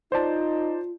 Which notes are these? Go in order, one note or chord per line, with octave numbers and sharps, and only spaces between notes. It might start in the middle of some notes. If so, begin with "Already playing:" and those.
D#4 F4 C5 D5 A5